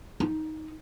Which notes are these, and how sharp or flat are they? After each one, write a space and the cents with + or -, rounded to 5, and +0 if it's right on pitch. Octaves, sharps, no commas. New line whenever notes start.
D#4 +10